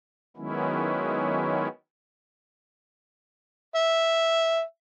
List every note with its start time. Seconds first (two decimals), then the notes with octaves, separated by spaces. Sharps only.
0.37 D#3 F#3 G#3 B3 C#4 E4
3.76 E5